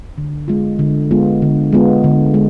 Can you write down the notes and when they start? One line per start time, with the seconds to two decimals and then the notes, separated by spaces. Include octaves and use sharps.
0.18 D3
0.48 G#3 B3 F4
0.79 D3
1.11 G#3 B3 F4
1.42 D3
1.73 G#3 B3 F4
2.04 D3
2.34 G#3